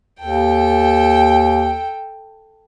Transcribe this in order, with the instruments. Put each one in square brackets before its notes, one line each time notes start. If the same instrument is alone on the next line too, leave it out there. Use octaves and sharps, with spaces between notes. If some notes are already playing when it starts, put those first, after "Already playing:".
[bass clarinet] D#2 [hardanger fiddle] A4 G5